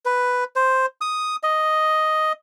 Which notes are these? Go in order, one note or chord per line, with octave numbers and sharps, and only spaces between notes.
B4
C5
D#6
D#5